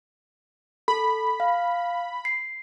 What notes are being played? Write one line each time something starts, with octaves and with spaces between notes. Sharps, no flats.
A4 B5
F5
C7